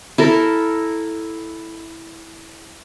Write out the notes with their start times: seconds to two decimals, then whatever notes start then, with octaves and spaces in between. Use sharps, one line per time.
0.18 E4 A4 A#4